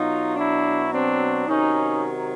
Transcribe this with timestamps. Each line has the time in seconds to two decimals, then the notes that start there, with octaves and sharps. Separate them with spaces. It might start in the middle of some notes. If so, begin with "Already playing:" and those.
Already playing: B2 F#3 D#4 F4
0.37 D4 E4
0.92 C4 D4
1.48 C3 D#3 F#3 C#4 D#4